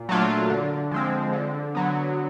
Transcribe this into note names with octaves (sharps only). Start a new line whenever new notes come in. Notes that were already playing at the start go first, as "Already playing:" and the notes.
Already playing: A#2
F#3 A3 D4 F4
D3
F3 G#3 C4
D3
F#3 B3